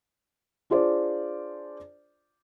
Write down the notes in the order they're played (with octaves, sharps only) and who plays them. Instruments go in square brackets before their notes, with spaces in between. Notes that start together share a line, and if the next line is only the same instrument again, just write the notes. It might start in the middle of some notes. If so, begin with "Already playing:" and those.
[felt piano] D4 F4 G#4 C5 D5